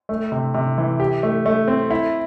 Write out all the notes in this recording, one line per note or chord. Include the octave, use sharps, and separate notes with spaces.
A3
C3
C3
E3
G4
A3
A3
C4
E4